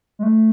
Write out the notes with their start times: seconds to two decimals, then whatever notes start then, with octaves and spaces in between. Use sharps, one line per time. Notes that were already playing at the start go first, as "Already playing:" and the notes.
0.19 G#3
0.23 A3